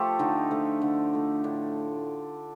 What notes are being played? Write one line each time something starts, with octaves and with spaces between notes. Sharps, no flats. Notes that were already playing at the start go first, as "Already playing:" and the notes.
Already playing: F3 A3 F4 G4 A4
D3 D#4
F3 A3
D3
F3 A3
A2 D4